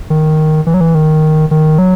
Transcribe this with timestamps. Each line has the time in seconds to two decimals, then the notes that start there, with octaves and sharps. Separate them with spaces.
0.10 D#3
0.67 E3
0.74 F#3
0.81 E3
0.95 D#3
1.51 D#3
1.78 F#3